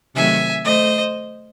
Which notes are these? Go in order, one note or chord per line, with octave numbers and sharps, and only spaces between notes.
C3 D#3 F#3 A3 E5 G#5
A3 C5 D#5